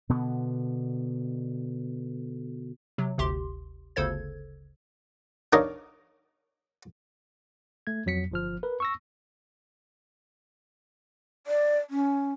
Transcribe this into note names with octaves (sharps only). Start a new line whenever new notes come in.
B2 D3 B3
C3 F#3
G1 D2 C3 G4 C6
G1 D2 C#3 A4 C5 G#6
D4 D#4 A#4 C#5 D#5 F5
A3 G#6
F2 F#3 B6 C#7
G1 F3 F6
A#4 B4
C#6 E6 A#6
D5
C#4